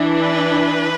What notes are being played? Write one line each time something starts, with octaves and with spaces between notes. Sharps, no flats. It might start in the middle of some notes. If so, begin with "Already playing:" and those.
Already playing: E3 D4
B4